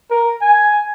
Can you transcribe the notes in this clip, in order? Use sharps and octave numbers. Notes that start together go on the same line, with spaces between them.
A#4
G#5